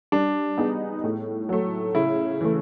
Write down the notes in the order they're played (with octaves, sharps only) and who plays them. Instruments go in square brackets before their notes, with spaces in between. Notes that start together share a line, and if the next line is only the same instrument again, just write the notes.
[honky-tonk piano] G3 [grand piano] D4
[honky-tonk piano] B3 D#4 G#4
A2
F#3 A3
[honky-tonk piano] C#3 [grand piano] E4
[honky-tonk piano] E3 A3